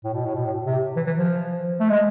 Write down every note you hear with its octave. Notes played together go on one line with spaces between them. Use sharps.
A2
B2
A2
B2
A2
C3
E3
E3
F3
A3
G#3